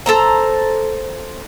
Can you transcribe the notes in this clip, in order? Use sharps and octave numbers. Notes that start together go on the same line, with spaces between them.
A4 C5 A#5